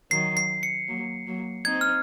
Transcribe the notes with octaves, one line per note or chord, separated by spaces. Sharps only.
D#3 F#3 C7
C7
C#7
F#3 A#3
F#3 A#3
C4 D#4 G#6
F6